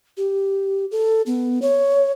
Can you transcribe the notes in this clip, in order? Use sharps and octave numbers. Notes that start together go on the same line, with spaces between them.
G4
A4
B3
C#5